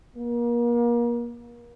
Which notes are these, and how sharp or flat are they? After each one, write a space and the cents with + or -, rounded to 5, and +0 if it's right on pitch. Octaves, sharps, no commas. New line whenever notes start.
A#3 +35